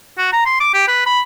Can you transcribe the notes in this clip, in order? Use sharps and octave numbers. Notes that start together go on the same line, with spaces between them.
F#4
A#5
C6
D6
G4
B4
B5